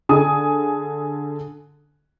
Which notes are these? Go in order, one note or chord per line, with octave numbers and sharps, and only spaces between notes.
D3 G#4 G#5 D#6